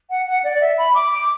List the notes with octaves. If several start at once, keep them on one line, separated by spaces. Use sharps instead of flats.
F#5
F#5
D5
E5
B5
D6
D6